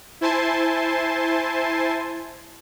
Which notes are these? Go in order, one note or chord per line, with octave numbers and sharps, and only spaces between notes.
E4 C5 G#5 A5 C6